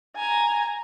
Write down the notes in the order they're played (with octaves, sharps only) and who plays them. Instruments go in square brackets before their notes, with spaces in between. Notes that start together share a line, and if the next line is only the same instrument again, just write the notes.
[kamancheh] G#5 A#5